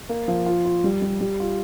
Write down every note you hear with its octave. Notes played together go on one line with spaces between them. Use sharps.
A#3
F3
F4
F4
G3
G3
G3
F4